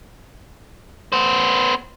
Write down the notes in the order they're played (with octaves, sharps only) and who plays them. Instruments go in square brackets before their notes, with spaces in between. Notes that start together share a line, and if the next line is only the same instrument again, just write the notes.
[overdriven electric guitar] B3 C5